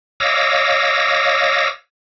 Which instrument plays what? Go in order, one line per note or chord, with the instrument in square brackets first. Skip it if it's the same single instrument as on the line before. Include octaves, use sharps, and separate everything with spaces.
[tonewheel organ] C#5 D#5 F5 D6 E6 A#6